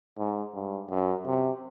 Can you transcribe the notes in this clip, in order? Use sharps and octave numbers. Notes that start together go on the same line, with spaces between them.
G#2
G2
F#2
C3